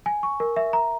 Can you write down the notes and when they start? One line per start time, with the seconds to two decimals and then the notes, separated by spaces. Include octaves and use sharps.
0.06 G#5
0.23 C#6
0.40 A#4
0.56 E5
0.73 A#5